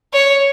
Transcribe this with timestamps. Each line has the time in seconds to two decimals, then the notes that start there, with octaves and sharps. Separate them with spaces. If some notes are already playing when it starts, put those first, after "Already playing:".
0.13 C#5